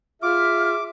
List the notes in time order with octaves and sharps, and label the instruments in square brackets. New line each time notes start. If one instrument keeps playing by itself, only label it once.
[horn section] F4 [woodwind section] G#4 E5 [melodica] D6 [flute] F6